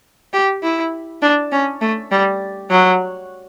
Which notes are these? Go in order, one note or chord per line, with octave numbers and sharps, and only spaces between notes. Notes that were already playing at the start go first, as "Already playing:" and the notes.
G4
E4
D4
C#4
A3
G3
F#3